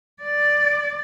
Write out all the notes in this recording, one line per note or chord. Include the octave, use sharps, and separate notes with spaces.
D5